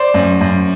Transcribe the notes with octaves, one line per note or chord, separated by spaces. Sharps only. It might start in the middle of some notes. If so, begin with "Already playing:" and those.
Already playing: C5 D5
F#2
F#2